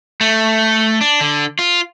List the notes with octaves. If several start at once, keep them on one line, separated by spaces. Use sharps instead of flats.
A3
D4
D3
F4